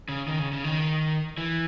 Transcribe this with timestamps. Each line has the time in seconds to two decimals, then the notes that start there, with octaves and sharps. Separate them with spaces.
0.09 C#3
0.28 D#3
0.39 C#3
0.52 C#3
0.64 D#3
1.38 E3